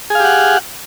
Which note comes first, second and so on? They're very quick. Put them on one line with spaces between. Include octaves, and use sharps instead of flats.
G#4 F5 G4 F#5